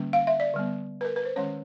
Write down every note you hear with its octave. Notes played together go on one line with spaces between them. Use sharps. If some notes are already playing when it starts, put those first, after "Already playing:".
Already playing: D3 G3 A#3 C#4
F5
E5
D5
D3 G3 B3
B4
A#4
B4
C5
D#3 G#3 C#4 C#5